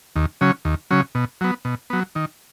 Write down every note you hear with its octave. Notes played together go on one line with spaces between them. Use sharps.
D#2
C#3 F#3 C#4
D#2
C#3 F#3 C#4
B2
F#3 B3
B2
F#3 B3
D#3